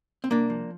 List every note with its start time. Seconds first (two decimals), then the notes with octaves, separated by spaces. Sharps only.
0.24 C4
0.31 C2 A#3 D4
0.50 F3